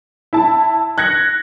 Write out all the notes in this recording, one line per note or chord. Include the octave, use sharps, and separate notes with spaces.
E4 A5
F#6 G#6 A#6 C#7